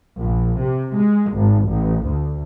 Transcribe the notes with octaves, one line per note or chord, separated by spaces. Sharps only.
A#1
C3
G#3
G#1
A1
D2